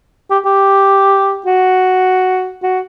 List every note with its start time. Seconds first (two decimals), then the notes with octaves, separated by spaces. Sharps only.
0.31 G4
0.46 G4
1.46 F#4
2.63 F#4